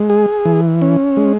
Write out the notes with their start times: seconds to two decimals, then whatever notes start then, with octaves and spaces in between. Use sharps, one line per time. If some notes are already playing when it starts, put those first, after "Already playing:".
Already playing: G#3
0.10 G#4
0.45 E3
0.82 C#4
1.17 G#3